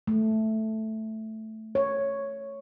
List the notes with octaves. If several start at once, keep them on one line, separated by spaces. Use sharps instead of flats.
A3
C#5